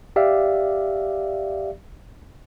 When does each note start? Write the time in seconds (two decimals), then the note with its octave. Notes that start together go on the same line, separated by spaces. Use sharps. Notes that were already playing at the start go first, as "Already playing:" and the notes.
0.16 G4 D5 E5 F5